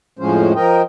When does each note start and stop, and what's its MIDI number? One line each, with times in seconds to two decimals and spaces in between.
0.19 0.53 41
0.19 0.53 45
0.19 0.53 53
0.19 0.53 56
0.19 0.53 61
0.19 0.53 72
0.55 0.82 53
0.55 0.82 70
0.55 0.82 75
0.55 0.82 79